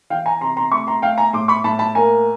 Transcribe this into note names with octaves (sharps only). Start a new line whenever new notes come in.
E3 F5 G5
G#5 A#5
C3 A#5 C6
A#5 C6
A3 B5 C#6
A#5 C6
A3 F5 G5
G#5 A#5
A2 C6 D6
B5 C#6
A2 A5 B5
A5 B5
A#3 G#5 A#5